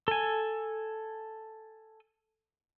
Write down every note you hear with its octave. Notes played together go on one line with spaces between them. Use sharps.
A4 G#5